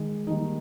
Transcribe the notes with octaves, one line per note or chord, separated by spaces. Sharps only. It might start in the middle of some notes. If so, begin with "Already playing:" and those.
Already playing: D#3 G#3
D#3 G3 A#3 D#4